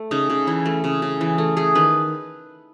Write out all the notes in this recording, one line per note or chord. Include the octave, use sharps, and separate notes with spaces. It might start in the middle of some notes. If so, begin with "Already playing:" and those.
Already playing: A3
C#3 D#4
C#3
E3 E4
A3
C#3
C#3
E3
A3
A3 G#4
D#3 B4